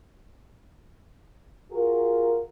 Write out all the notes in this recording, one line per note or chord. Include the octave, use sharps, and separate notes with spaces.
F4 F#4 G#4 A#4